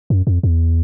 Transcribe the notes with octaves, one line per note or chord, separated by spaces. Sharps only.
F#2
F2
E2